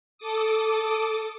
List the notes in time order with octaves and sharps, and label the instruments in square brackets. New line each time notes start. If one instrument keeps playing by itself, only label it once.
[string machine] A4 D6 D#6